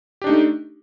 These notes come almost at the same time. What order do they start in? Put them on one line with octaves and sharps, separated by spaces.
G4 D4 D#4 A3